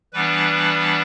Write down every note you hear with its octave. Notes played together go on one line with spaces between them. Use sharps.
E3 G3 B3 D4 B4